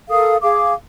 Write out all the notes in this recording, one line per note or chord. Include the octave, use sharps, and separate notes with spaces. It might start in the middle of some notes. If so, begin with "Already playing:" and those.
A4 A#4 F5 D#6
G#4 F5 D6